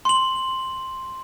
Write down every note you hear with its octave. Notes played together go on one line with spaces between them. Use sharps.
C6 F#7